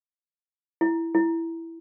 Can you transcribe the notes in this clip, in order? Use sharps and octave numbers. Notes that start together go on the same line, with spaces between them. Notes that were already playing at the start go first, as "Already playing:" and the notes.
E4
E4